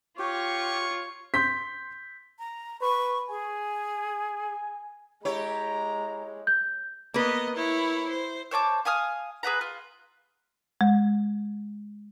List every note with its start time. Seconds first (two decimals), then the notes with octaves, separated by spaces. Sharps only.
0.19 F4 G4 C#5 C#6
1.34 C6 G6 B6
2.39 A#5
2.81 B4 C#6
3.29 G#4 G#5
5.25 G#3 E4 G4 C#5 A#5
6.47 G6
7.14 A#3 B3 B4 D#5
7.55 E4 C#5
8.09 C5
8.51 C5 C#5 A5 D6
8.85 F5 G#5 D#6 F6
9.43 G#4 B4 F#5 A#5
9.61 F4
10.81 G#3